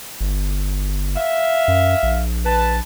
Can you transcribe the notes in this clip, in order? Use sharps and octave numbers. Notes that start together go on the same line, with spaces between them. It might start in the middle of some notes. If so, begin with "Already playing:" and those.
G1
E5 F5
F#2
A#1
B4 A5